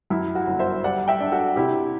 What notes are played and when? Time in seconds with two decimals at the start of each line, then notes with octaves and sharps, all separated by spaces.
0.10 F#2 E4
0.35 F#4
0.47 G1
0.59 C5 E5
0.84 G3 D5 F#5
1.08 E5 G5
1.20 D4
1.32 F#4 A4
1.56 C3 E4 G4